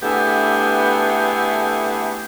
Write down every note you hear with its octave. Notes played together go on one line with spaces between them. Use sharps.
D3 A3 B3 E4 G4 G#4